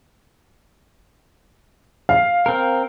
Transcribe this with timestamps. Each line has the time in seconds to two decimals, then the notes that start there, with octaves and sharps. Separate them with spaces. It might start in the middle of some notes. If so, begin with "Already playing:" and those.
2.09 F5
2.46 C4 A#4